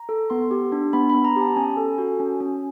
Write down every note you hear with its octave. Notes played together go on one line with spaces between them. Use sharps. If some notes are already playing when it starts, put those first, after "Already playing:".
Already playing: A#5
A4
B3 C6
G4
D4
B3 B5
B3 B5
A#5
G4
A5
C#4 G#5
A4
F#4
C#4
C#4